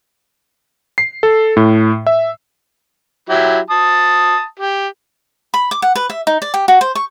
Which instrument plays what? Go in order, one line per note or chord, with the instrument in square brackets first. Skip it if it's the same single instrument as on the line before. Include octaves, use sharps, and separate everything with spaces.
[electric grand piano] C7
A4
A2
E5
[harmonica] F#3 E4 G4
A5 D#6
G4
[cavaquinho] B5
D6
F#5
B4
E5
D#4
D5
G4
F#4
C5
C#6